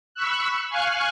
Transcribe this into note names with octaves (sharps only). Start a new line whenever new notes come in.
B5 C#6 E6 F#6
F5 G#5 C#6 F6 F#6